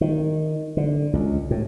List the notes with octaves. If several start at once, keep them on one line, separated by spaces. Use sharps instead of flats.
D#3
D3
C#2
A2